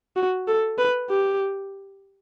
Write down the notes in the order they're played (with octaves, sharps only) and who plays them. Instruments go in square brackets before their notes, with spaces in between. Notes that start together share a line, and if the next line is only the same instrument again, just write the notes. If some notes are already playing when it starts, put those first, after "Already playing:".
[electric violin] F#4
A4
B4
G4